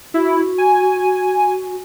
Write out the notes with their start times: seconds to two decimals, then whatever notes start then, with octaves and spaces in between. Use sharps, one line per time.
0.14 E4 F#4
0.58 G#5